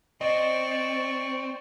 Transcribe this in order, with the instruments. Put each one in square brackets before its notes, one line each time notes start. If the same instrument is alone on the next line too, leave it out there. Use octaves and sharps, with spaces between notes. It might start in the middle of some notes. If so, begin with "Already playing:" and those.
[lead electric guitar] C4 [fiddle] D5 C#6 [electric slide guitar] D#5